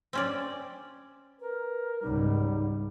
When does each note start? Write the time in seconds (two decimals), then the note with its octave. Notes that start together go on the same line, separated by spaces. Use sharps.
0.13 C4 C#4 D5
1.40 A#4 B4
2.02 C#2 G#2 G3 D#4